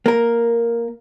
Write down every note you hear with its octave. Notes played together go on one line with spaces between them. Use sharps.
A#3 A#4